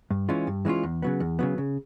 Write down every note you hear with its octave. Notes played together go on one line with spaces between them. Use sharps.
G2
E3 G#3 C#4 F4
G2
E3 G#3 C#4 F4
E2
C#3 F#3 B3
E2
C#3 F#3 B3
C#3